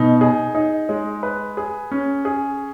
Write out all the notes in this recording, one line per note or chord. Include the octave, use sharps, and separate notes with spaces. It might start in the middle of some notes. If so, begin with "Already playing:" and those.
Already playing: B2 D#4
G#4
D#4
G#3
B4
G#4
C#4
G#4